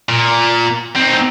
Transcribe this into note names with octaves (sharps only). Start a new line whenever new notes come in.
A#2
C4 D#4